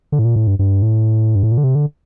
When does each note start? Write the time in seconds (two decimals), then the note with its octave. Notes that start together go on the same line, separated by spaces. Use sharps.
0.12 D3
0.19 A2
0.25 A#2
0.36 A2
0.47 G2
0.59 G2
0.82 A2
1.35 G2
1.43 A2
1.52 A#2
1.58 D3
1.64 C3
1.75 D3